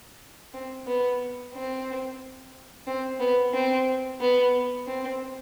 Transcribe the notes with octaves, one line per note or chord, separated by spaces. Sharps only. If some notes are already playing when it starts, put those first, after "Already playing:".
C4
B3
C4
C4
B3
C4
B3
C4